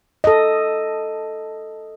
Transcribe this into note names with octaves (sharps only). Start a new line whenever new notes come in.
A4 D#5